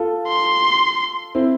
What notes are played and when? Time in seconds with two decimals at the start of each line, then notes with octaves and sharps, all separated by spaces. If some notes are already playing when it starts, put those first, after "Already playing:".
Already playing: F4 A4
0.29 C6
1.35 C4 E4